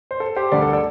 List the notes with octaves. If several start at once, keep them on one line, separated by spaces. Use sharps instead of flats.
C5
A4
G4 C5
D2 D3 G3 A4 D5
A4
A4 D5